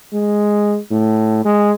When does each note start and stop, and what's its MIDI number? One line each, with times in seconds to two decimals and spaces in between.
0.13 0.78 56
0.91 1.43 45
1.45 1.72 56